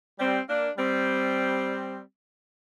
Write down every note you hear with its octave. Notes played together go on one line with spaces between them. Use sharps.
G3 C4
A#3 D4
G3 C4